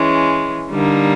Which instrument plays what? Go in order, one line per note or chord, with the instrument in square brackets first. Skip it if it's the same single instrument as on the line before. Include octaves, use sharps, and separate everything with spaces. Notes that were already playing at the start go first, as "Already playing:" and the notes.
Already playing: [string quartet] E3 G#3 C#4
D3 G3 A#3 D#4